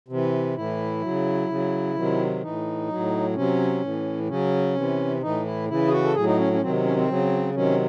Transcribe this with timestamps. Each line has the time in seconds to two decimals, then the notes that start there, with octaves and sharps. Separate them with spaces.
0.08 C3 E3
0.55 A2 E3 E4
1.02 C#3 F#3
1.49 C#3 F#3
1.95 C3 D#3 F#3
2.41 A2 E3 D#4
2.88 A2 F#3
3.35 C3 F#3 C#4
3.82 A2 E3
4.28 C#3 F#3 C#4
4.75 C3 E3
5.21 A2 E3 D#4
5.45 E4
5.68 C#3 E3 E4
5.88 G#4
5.91 F#4
6.05 A4
6.14 A2 F#3 G#4
6.26 D#4
6.38 C#4
6.53 C#4
6.61 C3 D#3 F#3 C4
6.84 C#4
6.97 C4
7.08 C#3 F#3
7.55 C3 D#3 F#3 C#4